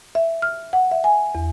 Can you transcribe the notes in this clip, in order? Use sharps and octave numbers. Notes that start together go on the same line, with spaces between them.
E5
F6
F#5
E5
G#5
E2